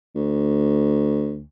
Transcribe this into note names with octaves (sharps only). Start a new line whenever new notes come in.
D2